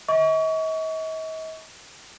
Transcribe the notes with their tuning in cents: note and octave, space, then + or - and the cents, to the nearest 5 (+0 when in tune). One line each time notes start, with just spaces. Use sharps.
D#5 +45 C#6 +30